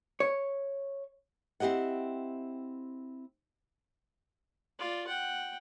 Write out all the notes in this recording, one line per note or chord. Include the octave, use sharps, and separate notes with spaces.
C#5
C4 E4 G4 D#5 F#5
F4 D5
F#5 G5